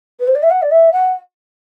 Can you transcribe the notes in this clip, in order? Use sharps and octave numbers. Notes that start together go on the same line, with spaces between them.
B4
C5
D5
E5
F#5
D5
E5
F#5